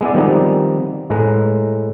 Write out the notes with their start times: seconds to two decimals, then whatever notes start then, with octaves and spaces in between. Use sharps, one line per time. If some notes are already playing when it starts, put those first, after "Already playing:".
0.01 G#3 B3 E4 D5
0.14 D#3 F3 G3 B3 C4 D#4
1.10 A2 G#3 B4 A#5